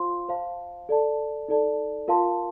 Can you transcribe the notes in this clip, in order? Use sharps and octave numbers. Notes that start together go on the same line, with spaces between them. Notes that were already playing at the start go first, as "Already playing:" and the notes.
Already playing: F4 C5 F5 C6
C5 F5 A5
A4 D5 A5
D#4 A4 D5 A5
F4 A#4 F5 A5 C6